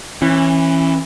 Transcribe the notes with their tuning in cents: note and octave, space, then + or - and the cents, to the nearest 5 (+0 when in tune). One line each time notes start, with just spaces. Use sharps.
E3 +0 C#4 -35